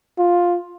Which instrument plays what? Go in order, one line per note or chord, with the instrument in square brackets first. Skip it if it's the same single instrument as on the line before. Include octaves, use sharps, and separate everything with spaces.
[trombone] F4